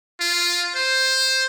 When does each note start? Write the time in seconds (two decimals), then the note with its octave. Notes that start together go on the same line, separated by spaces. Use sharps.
0.20 F4
0.75 C5